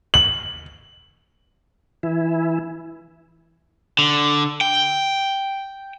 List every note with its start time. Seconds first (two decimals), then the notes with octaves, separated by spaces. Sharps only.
0.14 F#7
2.03 E3 E4
3.99 D3
4.61 G5